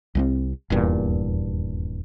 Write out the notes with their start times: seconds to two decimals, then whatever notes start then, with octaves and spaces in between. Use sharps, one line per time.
0.15 C2 G#3 C4
0.70 D#1 E2 G2 A#2